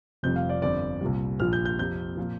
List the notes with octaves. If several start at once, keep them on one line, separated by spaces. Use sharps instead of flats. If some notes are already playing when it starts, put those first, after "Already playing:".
F1 F2 C3 G3 G6
F5
D5
G1 F2 F3 D5
C2 A#2 G3
A#1 A#2 F3 F6
G6
G6
F2 C3 F3 G6
A#2 F3